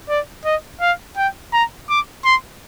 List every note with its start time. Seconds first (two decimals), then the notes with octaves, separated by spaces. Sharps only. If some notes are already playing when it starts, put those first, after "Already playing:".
0.09 D5
0.45 D#5
0.81 F5
1.17 G5
1.53 A#5
1.89 D6
2.25 C6